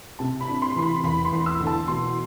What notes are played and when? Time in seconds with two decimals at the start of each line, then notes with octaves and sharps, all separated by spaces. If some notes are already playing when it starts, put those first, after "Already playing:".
0.19 C3 A5
0.41 B5
0.47 D4
0.62 C6
0.75 E3 C6
0.82 B5
1.03 E2 B5
1.25 C6
1.32 E2
1.46 E6
1.60 D3
1.67 A5
1.88 B2 C6